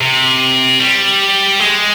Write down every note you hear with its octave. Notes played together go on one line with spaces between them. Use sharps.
C3
G3
G#3